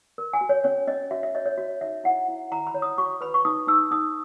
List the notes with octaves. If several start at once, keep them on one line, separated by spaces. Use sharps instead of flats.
A#4
G#5
F#4
C#5
C#4 C#5
C#4 D#5
F#4 E5
E5
C#5 D#5
C#5
F#4
D#4 E5
E4 F#5
E4
E4 A#5
B5
C#5
D#6
F#4 C#6
B4 B5
C#6
D#4 D#6
D#4 E6
D#4 D#6